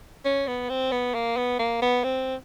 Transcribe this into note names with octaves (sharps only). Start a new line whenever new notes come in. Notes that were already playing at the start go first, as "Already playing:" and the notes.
C#4
B3
C4
B3
A#3
B3
A#3
B3
C4